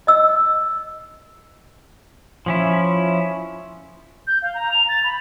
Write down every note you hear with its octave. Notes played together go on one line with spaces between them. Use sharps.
D#5 E6
F3 C#4 E4
G6
F5
A#5
F7
A6
B5